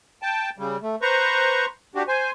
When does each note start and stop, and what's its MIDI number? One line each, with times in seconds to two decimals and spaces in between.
0.22 0.50 79
0.22 0.50 81
0.58 0.77 49
0.58 0.77 55
0.82 0.96 57
1.02 1.66 71
1.02 1.66 72
1.02 1.66 82
1.02 1.66 85
1.95 2.03 62
1.95 2.03 66
1.95 2.03 67
2.08 2.31 72
2.08 2.31 80